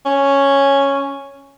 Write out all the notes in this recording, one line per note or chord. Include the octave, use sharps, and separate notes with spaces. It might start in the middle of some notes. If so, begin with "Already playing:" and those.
C#4